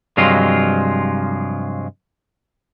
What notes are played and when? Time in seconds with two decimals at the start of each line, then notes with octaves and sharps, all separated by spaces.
0.17 G2 C3 F3 F#3 G#3 F4